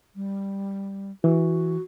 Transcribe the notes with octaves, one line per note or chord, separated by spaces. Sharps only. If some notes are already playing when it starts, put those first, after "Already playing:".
G3
E3 F#4